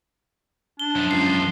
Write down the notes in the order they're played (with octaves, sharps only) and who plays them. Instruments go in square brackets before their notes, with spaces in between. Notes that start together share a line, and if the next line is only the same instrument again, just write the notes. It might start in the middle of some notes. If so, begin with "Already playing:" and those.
[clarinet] D4 [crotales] G7
[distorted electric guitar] F#2 F3
[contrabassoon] C#2 [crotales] C7